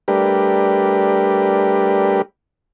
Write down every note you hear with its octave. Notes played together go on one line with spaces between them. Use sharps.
G3 A3 D4 G4 A#4 B4